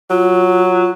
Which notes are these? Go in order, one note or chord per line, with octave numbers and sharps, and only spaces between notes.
F#3 F4